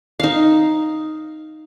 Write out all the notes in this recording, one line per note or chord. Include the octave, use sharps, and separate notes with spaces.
D#4 F5